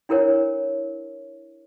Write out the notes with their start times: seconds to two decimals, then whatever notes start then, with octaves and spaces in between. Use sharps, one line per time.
0.09 D4 E4 A#4 B4 C#5